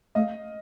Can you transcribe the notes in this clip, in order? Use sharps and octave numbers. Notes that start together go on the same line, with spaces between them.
A3 D#5 F5